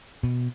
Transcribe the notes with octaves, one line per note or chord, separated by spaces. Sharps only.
B2